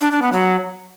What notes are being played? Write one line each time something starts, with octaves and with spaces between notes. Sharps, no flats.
D4
D4
B3
F#3